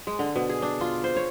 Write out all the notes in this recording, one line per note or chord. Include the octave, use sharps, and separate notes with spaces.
G#3
D3
B2
G#4
D4
F4
C5
C#5